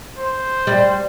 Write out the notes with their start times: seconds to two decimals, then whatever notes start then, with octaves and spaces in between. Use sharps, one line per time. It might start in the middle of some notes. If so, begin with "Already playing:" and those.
0.18 C5
0.67 G3